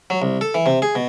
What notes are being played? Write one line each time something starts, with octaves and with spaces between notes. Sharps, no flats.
F#3
C2
A4
E3
C3
G#4
B2